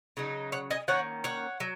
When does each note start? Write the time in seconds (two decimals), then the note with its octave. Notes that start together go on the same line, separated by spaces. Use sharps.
0.17 C#3 F#3 D#4
0.52 C#5 F#5
0.70 D#5 G#5
0.88 D#3 A#3 C#4 C#5 F#5
1.24 C#5 F#5
1.60 F#3